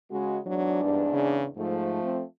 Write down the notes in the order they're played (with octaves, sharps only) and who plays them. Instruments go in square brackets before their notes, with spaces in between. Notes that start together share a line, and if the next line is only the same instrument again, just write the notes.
[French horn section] C#3 G#3 [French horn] F#4
[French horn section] E2 G#2 D4 [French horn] F#3
[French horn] G2
C#3
[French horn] G#2 [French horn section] F3 A3
[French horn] C4